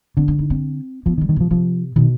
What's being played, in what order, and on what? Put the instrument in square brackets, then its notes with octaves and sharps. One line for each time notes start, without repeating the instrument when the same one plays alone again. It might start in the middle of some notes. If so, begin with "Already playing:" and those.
[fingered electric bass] D3 [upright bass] C4
[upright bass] D4
D#4
C4
[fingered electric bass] F3 [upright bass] B3
[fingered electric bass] D#3
[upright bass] G3
[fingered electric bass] D#3
[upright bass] C3 [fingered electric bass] F3
[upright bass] C3 [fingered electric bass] F3
[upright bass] B2 [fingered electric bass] D#3